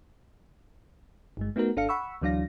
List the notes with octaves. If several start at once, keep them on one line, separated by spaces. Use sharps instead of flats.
G1 G2 G#3
A3 B3 D#4 F#4 A#4
G#1 D4 A4 F5 C#7
F#5 B5 C#6 E6
D2 E3 F#3 D4 F5 A#6